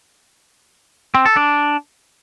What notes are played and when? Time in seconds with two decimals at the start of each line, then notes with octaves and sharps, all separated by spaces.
1.15 C4
1.26 A4
1.37 D4